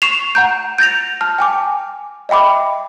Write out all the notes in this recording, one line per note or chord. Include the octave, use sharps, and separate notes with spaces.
C#6 C7 E7 F7
F#5 A#5 G6
G6 A6 A#6 F7
A5 F6
G5 G#5 D6
D#5 E5 G5 B5 D6